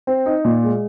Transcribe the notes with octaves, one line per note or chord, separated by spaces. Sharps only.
C4
D#4
A#2
G#3